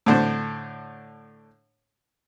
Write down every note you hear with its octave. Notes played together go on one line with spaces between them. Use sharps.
A2 D3 C5